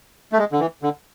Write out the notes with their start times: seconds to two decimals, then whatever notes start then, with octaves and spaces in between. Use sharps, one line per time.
0.32 A3
0.38 G#3
0.52 D3
0.60 E3
0.82 D3